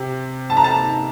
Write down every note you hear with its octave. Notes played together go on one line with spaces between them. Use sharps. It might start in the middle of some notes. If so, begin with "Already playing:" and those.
Already playing: C3
A5
A#5
A5